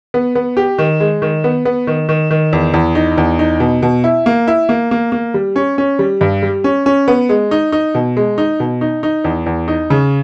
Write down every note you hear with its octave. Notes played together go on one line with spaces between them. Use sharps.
B3
B3
G4
D#3
G#3
D#3
B3
B3
D#3
D#3
D#3
E2
E2
D#4
E2
D#4
B2
B2
E4
A#3
E4
A#3
A#3
A#3
G3
C#4
C#4
G3
G2
G3
C#4
C#4
B3
G#3
D#4
D#4
B2
G#3
D#4
B2
D#4
D#4
E2
E2
D#4
C#3